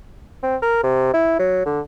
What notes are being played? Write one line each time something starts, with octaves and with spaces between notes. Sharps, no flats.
C4
A#4
C3
E4
F#3
D3